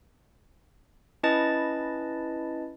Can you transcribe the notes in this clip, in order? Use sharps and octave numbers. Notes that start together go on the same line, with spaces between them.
C#4 E4 B4 D#5 A5 A6